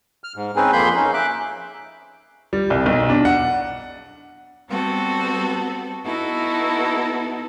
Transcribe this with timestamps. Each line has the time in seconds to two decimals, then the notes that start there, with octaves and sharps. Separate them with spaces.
0.24 F6
0.36 G#2
0.56 C4 C#4 D#4 G#4 B4
0.73 F2 A#3 G#4 B5 C6 G6
0.96 C#4 D#4
1.14 E5 D6 F#6
2.53 G3
2.70 C2
2.86 B1
3.09 D4
3.25 F#5
4.68 G3 B3 C4 F#4 A4
6.05 B3 D#4 E4 F#4 A4